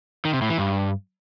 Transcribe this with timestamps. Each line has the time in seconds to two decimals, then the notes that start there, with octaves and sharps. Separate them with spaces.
0.25 D#3
0.33 C3
0.42 A2
0.50 E3
0.58 G2